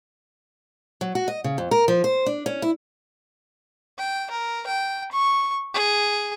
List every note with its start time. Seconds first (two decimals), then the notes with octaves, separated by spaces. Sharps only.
1.01 F#3
1.15 F#4
1.28 D#5
1.44 C#3
1.58 F2
1.71 A#4
1.88 F3
2.04 C5
2.26 D4
2.46 C#4
2.62 E4
3.98 G5
4.31 A#4
4.67 G5
5.12 C#6
5.74 G#4